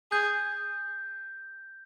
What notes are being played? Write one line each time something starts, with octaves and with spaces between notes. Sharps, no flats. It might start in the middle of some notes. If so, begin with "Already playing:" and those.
G#4 G6